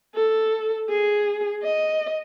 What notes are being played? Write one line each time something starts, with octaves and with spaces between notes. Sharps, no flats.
A4
G#4
D#5